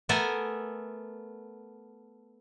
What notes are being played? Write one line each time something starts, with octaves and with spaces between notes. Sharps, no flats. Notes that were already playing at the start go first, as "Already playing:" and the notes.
A3 B3 A4 A#4 G#5